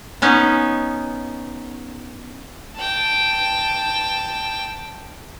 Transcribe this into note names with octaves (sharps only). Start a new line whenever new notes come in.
B3 C#4 D#4
G5 A5